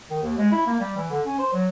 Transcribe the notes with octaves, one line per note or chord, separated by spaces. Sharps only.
D#3
D#2
G#3
E4
A#3
G3
E3
D3
C#4
C5
F#3